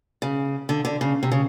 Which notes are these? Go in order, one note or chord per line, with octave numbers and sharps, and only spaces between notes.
C#3
D3
D3
C#3
C3
C#3